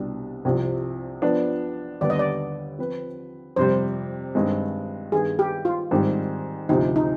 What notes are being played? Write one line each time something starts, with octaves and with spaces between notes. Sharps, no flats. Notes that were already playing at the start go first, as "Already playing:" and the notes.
Already playing: C2 B2 G3 D4
C2 C3 F3
F3 B3 D4
D#2 D3 G3 B3 D5
D#5
D5
F3 C4 F4 B4
F2 C3 G3 C5
G2 D#3 G#3 C4
G2 D#3 B3 G#4
G4
F4
G#2 D#3 G3 C4 G4
D2 C3 F3 D#4
D#4